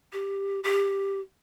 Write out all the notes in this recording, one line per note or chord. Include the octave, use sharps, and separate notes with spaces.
G4
G4